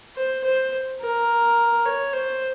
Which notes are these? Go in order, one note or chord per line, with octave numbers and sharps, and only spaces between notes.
C5
C5
A#4
C#5
C5